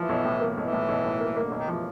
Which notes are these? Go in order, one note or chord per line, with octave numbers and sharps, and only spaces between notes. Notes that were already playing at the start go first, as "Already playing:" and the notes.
Already playing: E3 F3
B1
A2
A#3
B1 E3
A2
B1
A2
A#3
A#3
D3
B1
D#3
E3 F3